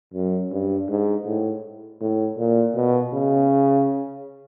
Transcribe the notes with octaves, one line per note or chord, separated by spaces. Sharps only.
F#2
G2
G#2
A2
A2
A#2
B2
C#3